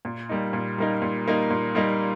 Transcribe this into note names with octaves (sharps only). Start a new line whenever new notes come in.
A#2
G3 A#3 D#4
A#2
G3 A#3 D#4
A#2
G3 A#3 D#4
A#2
G3 A#3 D#4